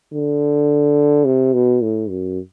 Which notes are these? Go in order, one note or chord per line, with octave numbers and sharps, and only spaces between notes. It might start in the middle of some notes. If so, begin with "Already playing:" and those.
D3
C3
B2
A2
F#2